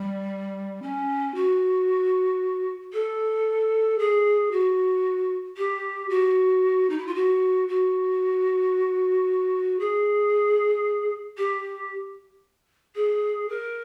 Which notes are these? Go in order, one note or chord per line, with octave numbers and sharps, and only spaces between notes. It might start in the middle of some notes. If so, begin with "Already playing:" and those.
Already playing: G3
C#4
F#4
A4
G#4
F#4
G4
F#4
D#4
E4
F4
F#4
F#4
G#4
G4
G#4
A#4